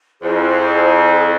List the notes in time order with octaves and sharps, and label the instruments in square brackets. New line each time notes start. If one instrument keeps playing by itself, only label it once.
[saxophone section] F2 [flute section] E4 G#4 C5